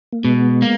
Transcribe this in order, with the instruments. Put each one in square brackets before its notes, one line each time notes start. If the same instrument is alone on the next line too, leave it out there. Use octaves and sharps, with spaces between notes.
[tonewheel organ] A#3
[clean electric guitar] B2 [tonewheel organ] G#3 B3
[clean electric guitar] A#3